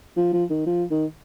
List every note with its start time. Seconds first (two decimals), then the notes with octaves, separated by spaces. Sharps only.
0.17 F3
0.33 F3
0.50 D#3
0.67 F3
0.91 D#3